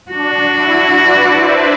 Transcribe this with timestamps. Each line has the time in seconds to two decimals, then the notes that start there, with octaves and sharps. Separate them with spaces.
0.11 D4 F#4
0.57 E4
1.03 B4 D5
1.34 C5 E5